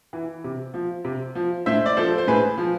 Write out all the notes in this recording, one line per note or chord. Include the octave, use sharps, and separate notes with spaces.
E3
C3
F3
C3
F3
A2 C5 E5
D5
F3 A4 C5
C5
A2 G#4 B4
F3